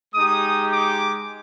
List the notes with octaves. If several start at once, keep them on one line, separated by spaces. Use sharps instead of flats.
G#3 D#4 G4 D#6
D6